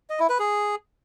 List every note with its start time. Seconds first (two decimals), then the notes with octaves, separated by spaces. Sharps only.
0.10 D#5
0.20 E4
0.29 B4
0.39 G#4